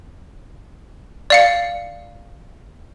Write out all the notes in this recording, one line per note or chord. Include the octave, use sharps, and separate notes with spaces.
D5 F5 C#7